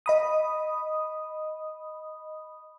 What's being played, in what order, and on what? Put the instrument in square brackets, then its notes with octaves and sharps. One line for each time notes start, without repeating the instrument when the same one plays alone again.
[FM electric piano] D#5 B5 D#6